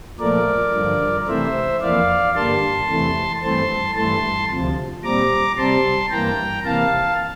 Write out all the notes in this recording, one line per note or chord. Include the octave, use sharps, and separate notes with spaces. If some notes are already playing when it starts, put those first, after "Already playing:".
A#2 F3 A3 A#4 D5
G2 D3 F3
C3 E3 A3 C4 C5 E5
F2 E3 A#3 D5 F5
G2 D3 G3 A#3 A5 C6
E2 C3 E3 A3
G2 E3 A3 C4 A5 C6
G2 E3 A3 A5 C6
D2 C3 F3
A#2 G3 C4 A#5 D6
C3 G3 C4 A5 C6
G2 E3 A#3 G5 A#5
C3 E3 A#3 F5 A5